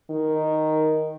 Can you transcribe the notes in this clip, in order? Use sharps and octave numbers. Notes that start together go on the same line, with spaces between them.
D#3